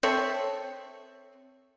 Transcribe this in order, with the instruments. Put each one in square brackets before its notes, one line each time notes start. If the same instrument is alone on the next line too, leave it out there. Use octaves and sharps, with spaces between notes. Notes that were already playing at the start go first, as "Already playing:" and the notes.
[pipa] C4 A4 C#5 E5